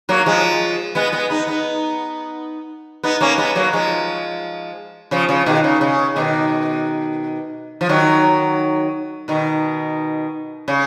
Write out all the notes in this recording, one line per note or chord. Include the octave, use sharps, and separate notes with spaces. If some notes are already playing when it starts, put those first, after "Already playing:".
F#3 A#3
F3 G#3
G#3 B3
G#3 B3
B3 D#4
B3 D#4
B3 D#4
A#3 C#4
G#3 B3
F#3 A#3
F3 G#3
C#3 F3
C#3 F3
B2 D#3
C#3
C#3
B2 D#3
F3
D#3 F#3
B2 D#3
C#3